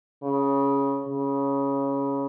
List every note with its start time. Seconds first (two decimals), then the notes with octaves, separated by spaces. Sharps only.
0.23 C#3
1.07 C#3